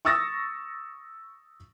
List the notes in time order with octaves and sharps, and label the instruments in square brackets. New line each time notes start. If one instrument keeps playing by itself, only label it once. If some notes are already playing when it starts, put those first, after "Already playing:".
[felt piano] C#6 D#6 E6 A6 A#6